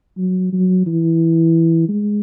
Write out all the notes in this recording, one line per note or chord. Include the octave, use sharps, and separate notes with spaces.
F#3
F#3
E3
G#3